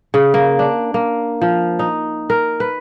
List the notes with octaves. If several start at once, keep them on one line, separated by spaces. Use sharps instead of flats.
C#3
A#3
D4
A#3
F3
D#4
A#4
B4